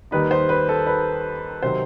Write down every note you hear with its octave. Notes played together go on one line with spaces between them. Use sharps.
D#2 D#3 G3 D#4 B4
C5
B4
A4
B4
C3 D#3 F#3 C4 C5